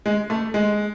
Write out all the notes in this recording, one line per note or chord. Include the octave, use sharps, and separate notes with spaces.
G#3
A3
G#3